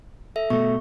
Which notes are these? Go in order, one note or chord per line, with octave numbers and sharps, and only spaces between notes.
A4 E5
B2 A3 C#6